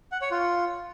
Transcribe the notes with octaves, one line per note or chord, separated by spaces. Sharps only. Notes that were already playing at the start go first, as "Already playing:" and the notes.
F#5
C#5
F4